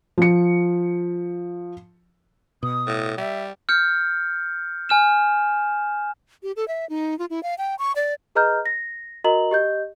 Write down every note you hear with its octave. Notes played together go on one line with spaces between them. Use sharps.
F3 C#7
B2 D#6
A2
G3 E5
F6 G6 C#7
G#5 F6 E7
G4
A4
E5
D#4
F4
E4
F5
G5
C#6
D5
G#4 B4 D#5 A#5 F6 G6
A#6
F#4 A#4 D#5 A#5 F#7
G4 D#5 G6